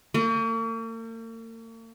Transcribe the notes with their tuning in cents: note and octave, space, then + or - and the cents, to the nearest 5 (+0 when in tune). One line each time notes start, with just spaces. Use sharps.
A#3 -45